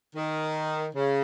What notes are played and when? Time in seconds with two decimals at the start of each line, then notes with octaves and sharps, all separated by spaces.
0.15 D#3
0.95 C#3